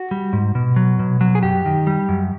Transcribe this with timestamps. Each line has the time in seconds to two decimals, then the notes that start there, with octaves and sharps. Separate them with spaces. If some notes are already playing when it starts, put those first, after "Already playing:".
Already playing: F#4
0.11 G3
0.33 G#2
0.55 B2
0.76 F#3
0.99 B2
1.21 F#3
1.35 G#4
1.43 F#2 G4
1.66 D#3
1.87 G3
2.09 F#2